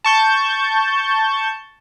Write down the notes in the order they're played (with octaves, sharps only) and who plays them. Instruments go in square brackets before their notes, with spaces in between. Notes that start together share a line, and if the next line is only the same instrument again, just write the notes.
[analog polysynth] A5 C#6 G6